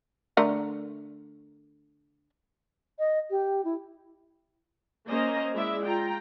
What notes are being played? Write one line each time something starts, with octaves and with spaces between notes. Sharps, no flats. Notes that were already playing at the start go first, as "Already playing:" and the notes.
D3 A3 A#4
D#5
G4
E4
A#3 C#4 C5 D#5 G#5 A#5
G#3 E4 D5 E5
F4 G5 A#5